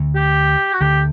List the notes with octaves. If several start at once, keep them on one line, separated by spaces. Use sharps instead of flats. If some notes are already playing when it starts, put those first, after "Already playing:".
Already playing: D2 D3
G4
F#4
D2 D3 G4